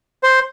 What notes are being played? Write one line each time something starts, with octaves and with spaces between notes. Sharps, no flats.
C5